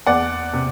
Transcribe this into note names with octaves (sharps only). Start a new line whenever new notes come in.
E2 D5 F#5
C3